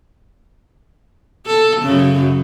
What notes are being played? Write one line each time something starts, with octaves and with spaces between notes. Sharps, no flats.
A4
F#2 C#3